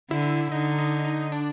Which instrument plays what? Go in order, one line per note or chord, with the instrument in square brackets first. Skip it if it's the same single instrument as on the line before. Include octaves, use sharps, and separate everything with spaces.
[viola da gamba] D3 [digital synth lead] E4
[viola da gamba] D3 [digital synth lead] D#4
[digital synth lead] D#4
D#4
D4